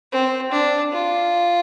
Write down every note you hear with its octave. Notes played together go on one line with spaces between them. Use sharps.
C4
D4
F4